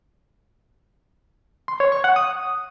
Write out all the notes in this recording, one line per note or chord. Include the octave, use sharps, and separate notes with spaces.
C6
C#5
C#6
F#5
D#6